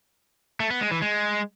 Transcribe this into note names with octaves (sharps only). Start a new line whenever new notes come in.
A3
B3
G#3
E3
G#3